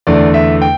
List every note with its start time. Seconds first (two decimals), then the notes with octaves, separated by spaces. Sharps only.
0.07 E2 D3 A3 D5
0.34 E5
0.62 G5